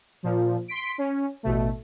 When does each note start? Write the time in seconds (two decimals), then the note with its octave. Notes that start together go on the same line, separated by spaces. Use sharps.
0.23 A#2 F3
0.68 C6 B6 D7
0.98 C#4
1.43 A1 B2 A3